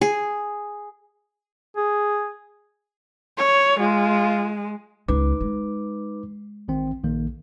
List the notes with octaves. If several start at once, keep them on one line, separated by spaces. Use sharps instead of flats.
G#4
G#4
C#5
G#3 F4
C#2 D#4 B4 D6
G#3
A1 D#3 C4
A#1 D#3 A#3